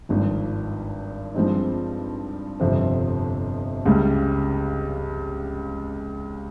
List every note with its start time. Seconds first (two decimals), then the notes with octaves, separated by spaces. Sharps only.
0.09 G#1 G2 F3
1.35 G2 F3 G#3 C4 D#4
2.60 G1 F2 C3 F3 C4
3.86 C#2 C#3 G3